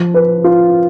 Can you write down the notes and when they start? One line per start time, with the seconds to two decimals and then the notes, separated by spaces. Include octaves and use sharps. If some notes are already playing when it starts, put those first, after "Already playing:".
Already playing: F3
0.14 B4
0.44 F4